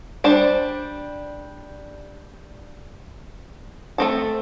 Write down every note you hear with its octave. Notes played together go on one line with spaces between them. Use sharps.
G3 D4 G4 C5
A3 C4 A4